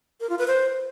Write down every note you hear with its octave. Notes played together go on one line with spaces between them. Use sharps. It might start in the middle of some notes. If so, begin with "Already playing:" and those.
A#4
F4
B4
C5